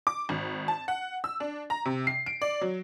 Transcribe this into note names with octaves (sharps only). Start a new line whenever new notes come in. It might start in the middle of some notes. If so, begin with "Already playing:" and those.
D6
G#1
A5
F#5
E6
D4
A#5
C3
C7
D7
D5
F#3